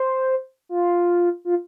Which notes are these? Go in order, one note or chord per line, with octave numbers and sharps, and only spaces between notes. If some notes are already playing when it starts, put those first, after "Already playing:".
Already playing: C5
F4
F4